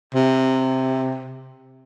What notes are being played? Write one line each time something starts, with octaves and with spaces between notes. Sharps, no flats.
C3